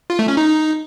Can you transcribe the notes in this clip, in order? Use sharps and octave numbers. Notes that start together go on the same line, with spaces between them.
F4
A3
C#4
D#4